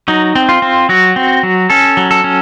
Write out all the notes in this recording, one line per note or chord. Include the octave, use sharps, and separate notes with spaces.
F#3 D#4
C4
F4
C4
F#3 F#4
C4
F#3
C#4 A4
F#3
A4
C#4